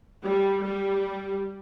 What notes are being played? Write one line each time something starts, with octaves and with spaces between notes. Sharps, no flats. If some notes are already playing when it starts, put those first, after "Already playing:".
G3
G3